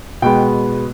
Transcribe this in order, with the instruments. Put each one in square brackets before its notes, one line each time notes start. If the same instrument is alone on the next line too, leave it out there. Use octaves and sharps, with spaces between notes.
[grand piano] B2 G#3 B3 G5